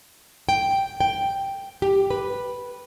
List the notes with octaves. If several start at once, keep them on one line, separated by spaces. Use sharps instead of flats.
G5
G5
G4
B4